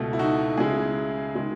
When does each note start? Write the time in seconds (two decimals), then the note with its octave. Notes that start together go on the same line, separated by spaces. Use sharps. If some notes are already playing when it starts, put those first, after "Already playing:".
Already playing: C#2 B2 A3
0.13 E4
0.19 D#4 F#4
0.57 C#2 C#3 G#3 E4 G#4
1.35 D#3 G#3